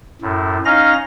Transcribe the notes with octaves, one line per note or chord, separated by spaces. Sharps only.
F#2 A2
C#4 D#4 D#5 F5 A#5 A#6